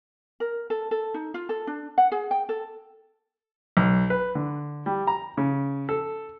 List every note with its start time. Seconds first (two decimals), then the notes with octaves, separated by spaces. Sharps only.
0.40 A#4
0.70 A4
0.91 A4
1.14 D#4
1.34 F4
1.49 A4
1.67 D4
1.98 F#5
2.12 G#4
2.31 G5
2.49 A4
3.77 B1
4.10 B4
4.35 D3
4.86 G3
5.07 A#5
5.37 C#3
5.89 A4